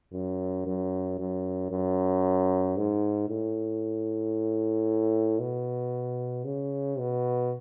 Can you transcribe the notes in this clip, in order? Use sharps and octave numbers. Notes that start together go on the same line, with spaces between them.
F#2
F#2
F#2
F#2
G#2
A2
B2
C#3
B2